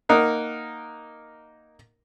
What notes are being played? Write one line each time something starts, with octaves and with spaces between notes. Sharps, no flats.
A#3 D#4 A#4 F#5